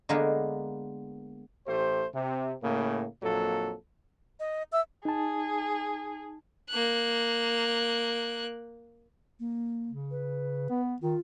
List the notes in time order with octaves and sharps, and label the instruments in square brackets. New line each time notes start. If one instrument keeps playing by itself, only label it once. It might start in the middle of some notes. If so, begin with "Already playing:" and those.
[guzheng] D3 G#3 A#3 B3 A#4 B4
[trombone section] A1 A3 G4 C5
C3
A2 C#3 A#3
A#1 F2 F#3 A#3 A4
[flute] D#5
[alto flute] E5 [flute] E6
[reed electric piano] D#4 A5 [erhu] G#4
[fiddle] A#3 F#6
[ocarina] A#3
[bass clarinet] C#3
[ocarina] B4
[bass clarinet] B3
[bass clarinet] D#3 [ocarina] F4